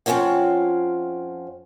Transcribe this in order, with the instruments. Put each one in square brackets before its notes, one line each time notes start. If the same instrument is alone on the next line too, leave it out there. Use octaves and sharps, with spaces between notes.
[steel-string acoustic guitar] F2 C4 C#4 F4 C#5 F#5